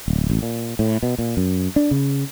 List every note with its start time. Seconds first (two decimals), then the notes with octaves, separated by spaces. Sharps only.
0.08 D1
0.30 A1
0.42 A#2
0.79 A2
1.03 B2
1.19 A#2
1.37 F#2
1.76 D4
1.91 C#3